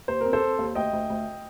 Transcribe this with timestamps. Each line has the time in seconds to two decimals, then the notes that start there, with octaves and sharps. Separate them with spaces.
0.08 D#2 C5
0.21 C4 A#4
0.33 A4 C5
0.42 C4
0.59 D#2
0.75 D2 D#5 G5
0.93 D2
1.10 D2